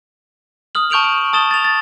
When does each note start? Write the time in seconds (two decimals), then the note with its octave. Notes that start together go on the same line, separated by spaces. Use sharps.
0.75 D#6 F6 F#7
0.90 A5 C#6 G6 D7 F7 F#7
1.04 D7
1.33 A5 D#6 A6 E7 G7
1.51 A6 F7
1.64 A6